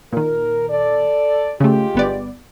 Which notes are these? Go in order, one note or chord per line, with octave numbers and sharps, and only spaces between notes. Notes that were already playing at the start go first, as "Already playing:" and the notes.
A#2 D#3 A#4
A4 D5
C#3 G#3 A3 F4 G4
G1 B3 D5